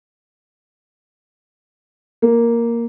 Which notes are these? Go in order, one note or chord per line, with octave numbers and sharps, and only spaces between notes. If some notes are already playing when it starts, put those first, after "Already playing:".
A#3